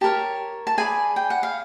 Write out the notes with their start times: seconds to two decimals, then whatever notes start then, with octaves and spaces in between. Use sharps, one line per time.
0.01 G4 A#4 C#5 A5
0.67 A5
0.77 G#4 B4 D5 G#5
1.16 G5
1.30 F#5
1.43 F5